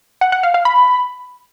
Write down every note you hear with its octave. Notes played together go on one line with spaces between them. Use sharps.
F#5
F#5
F5
F5
B5